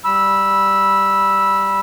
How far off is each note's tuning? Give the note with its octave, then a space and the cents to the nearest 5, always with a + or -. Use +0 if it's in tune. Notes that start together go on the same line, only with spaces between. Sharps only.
G3 +0 B5 -15 E6 +0